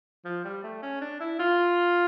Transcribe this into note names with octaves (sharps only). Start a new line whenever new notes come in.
F3
G3
A3
C#4
D4
E4
F4